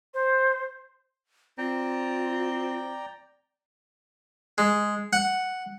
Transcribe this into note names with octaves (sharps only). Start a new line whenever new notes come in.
C5
C4 F4 D5 G5 A#5
G#3
F#5